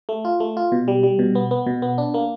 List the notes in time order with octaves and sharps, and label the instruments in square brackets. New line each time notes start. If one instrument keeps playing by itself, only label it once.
[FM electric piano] A3
F4
A3
F4
B2
G3
G3
B2
B3
B3
B2
B3
D4
A#3